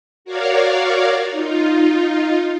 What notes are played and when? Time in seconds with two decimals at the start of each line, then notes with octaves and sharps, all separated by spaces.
0.25 F#4 A#4 C#5 D5 F5
1.31 D#4 F4